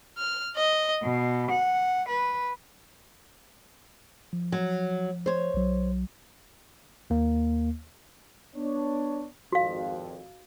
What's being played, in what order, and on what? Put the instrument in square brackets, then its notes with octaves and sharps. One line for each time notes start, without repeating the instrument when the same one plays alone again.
[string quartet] F6
D#5
B2
F#5
B4
[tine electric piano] F3
[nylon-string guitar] F#3
C5 C#5
[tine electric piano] B1 F#3
D#2 A#3
[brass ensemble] B3 D4 C#5
[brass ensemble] G#1 F2 [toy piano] F#4 F5